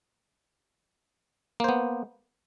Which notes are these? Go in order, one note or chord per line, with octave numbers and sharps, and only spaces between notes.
A#3 B3 C5